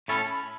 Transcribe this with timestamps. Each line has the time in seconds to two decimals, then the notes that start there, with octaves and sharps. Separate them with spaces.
0.08 A2 A3 C#4 A4 B5
0.19 A5
0.29 B5